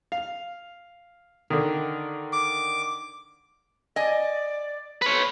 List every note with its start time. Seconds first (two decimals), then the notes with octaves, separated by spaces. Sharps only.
0.12 F5
1.50 D3 D#3
2.33 D6
3.96 D5 D#5 G#5
5.02 B4 C#5